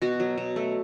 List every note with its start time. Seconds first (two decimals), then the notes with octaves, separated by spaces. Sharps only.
0.02 B2 F#4
0.20 F#3
0.38 B2
0.56 A3